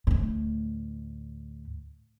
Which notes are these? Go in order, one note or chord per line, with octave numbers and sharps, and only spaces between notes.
D2 A2